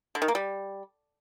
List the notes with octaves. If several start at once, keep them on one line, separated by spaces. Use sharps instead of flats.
D3
D#3
A#3
G3